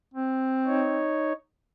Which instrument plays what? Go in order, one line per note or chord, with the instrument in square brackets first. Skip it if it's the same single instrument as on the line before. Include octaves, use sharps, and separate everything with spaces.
[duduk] C4
[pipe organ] D#4 C#5